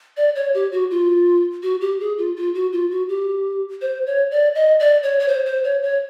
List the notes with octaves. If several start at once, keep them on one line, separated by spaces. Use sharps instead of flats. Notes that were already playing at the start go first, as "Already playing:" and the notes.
D5
C#5
G4
F#4
F4
F#4
G4
G#4
F4
F4
F#4
F4
F#4
G4
C5
C#5
D5
D#5
D5
C#5
C#5
C5
C5
C#5
C#5